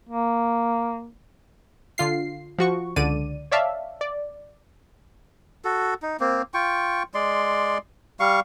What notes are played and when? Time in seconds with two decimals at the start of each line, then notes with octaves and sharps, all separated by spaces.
0.09 A#3
1.98 D3 F4 C7
2.58 F3 F#4 C#6
2.96 C#2 D3 D5 D#7
3.51 C#5 D5 E5 F5 A5
4.01 D5
5.65 F#4 A4
6.02 D#4
6.20 A#3 C4
6.54 F4 G5 C#6
7.14 G#3 D5 C6
8.20 G3 F5 C#6